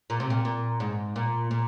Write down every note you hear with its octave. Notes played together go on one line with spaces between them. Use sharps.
A#2
C3
A#2
A#2
G#2
A#2
A#2